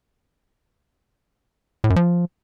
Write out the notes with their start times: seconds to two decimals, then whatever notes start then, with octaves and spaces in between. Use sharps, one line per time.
1.84 A2
1.90 F#2
1.96 F3